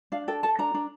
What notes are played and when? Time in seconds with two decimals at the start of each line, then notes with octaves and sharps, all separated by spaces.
0.12 D4 F5
0.28 A4 G5
0.43 A4 A5
0.59 D4 A#5
0.74 D4